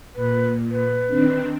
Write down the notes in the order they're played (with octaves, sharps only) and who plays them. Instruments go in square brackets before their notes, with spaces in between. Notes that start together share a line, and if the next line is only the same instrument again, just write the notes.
[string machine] A#2 [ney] B4
[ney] B4
[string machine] D#3 C4 D4